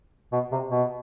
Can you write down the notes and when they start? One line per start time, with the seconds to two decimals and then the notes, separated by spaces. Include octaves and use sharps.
0.32 B2
0.52 C3
0.71 B2